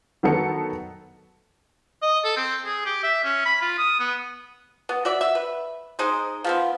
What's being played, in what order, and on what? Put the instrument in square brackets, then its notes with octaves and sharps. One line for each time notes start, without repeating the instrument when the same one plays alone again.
[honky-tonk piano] D#3 F#3 B3 F#4 A4 C#7
[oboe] D#5
A4
C4
G#4
G4
E5
C#4
B5
F4
D#6
B3
[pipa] B3
F#4 D5 E5
E5
B4
G#3 D#4 C5
F3 B3 C4